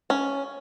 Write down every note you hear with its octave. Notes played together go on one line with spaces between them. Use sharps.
C#4